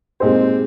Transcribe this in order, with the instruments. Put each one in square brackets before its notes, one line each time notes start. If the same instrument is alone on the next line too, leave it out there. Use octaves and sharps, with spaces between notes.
[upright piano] A#2 G#3 D#4 G4 C5 [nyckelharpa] C4